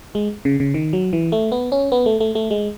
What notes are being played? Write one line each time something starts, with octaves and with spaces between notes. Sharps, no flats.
G#3
C#3
C#3
D#3
F#3
E3
A3
B3
C#4
B3
A3
A3
A3
G#3